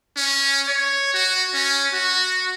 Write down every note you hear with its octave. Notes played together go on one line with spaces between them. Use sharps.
C#4
C#5
F#4
C#4
F#4